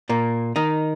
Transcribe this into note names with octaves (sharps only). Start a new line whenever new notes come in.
A#2 A#3
D#3 D#4